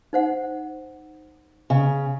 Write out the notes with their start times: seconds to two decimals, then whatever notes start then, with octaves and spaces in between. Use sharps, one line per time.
0.13 D#4 C5 F#5
1.70 C#3